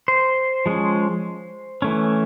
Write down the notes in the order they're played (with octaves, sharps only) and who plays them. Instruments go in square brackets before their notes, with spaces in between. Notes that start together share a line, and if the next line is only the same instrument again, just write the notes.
[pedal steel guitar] C5
F3 G#3 C#4
E3 A3 C#4